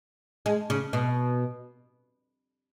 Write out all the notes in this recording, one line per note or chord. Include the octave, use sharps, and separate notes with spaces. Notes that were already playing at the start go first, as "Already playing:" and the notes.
G#3
C#3
B2